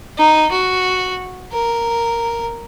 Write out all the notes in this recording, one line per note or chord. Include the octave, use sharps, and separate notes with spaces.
D#4
F#4
A#4